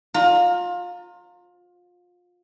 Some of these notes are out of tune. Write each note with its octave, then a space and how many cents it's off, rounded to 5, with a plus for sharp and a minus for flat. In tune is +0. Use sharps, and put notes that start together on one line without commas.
F4 +25 A#5 -20